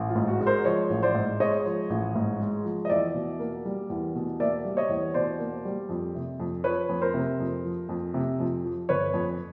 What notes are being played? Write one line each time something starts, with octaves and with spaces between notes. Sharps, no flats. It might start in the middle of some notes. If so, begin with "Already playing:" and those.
Already playing: A1
F4
G#2
F#4
G#3
A#4 C5
F3 C#5 D#5
A1
C5 D5
G#2
G#3 C#5 D#5
F3
A1
G#2
G#3
F3
D#5
E2 D5 E5
B2
A#3
G3
E2
B2
A#3 D5 E5
G3
C#5 D#5
E2
B2 C5 D5
A#3
G3
F2
C3
F2
F3 B4 C#5
F2
A#4 C5
C3
F2
F3
F2
C3
F2
F3
G1 B4 C#5
F2